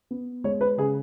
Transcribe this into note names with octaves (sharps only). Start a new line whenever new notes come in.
B3
G#3 C#5
B4
C#3 G#4